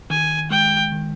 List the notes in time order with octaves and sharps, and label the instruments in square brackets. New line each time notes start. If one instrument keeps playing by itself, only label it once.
[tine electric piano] D#3 [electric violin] G#5
[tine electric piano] G#3 [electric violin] G5
[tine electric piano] D#3